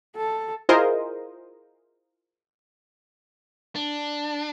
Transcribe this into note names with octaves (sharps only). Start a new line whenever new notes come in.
A4
E4 F4 G#4 A#4 C5 D#5
D4